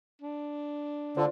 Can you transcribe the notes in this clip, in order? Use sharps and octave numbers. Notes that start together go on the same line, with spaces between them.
D4
D3 F4 C5 D5